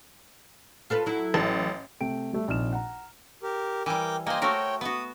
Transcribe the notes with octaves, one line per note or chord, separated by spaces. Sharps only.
F4 A4 B4
F#3 E4
A1
C3 A3 G5 D7
G3 A3 E5
A#1 C3 F3 D#4 F6 E7
F#5 A#5
G4 A#4
E3 G3 A#4 G5 D6
A#3 C5 D#5 G5 G#5
A3 F#4 A#4 C#5 G5
B3 F#4 D#6